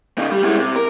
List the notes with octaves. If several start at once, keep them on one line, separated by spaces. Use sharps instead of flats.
C#3 D#4
G3
G#3 E4
C3
A#4